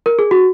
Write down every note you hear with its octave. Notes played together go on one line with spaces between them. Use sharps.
A#4
G#4
F#4